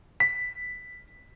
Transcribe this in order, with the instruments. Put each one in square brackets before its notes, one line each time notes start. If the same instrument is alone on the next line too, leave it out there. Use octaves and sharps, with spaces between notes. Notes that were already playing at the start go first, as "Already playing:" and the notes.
[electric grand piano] B6